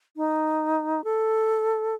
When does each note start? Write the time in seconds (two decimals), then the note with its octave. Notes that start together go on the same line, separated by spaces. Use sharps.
0.17 D#4
1.04 A4